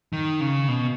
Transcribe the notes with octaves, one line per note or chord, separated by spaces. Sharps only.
D#3
C#3
B2